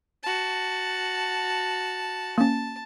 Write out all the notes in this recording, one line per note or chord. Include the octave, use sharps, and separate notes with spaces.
F#4 A5
A#3 C#4 A5